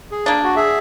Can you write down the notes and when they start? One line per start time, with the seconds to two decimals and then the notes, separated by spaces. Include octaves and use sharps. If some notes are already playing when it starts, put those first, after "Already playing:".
0.11 G#4
0.26 A#3 D4
0.43 F#4
0.56 G#4 E5